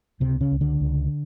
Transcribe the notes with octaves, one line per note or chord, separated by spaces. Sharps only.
C#2 C3 C4
C#3 C#4
C#2
D3 D4
C#2